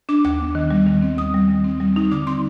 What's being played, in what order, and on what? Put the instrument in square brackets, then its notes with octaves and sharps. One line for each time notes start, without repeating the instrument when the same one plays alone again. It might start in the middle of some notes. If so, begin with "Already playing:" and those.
[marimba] D4 D6
D#2 D6
B3
D#3
G3
D#3
C4
D#2 D#6
G3
D#3
C4
G3
D#4
D3 D6
C4 C6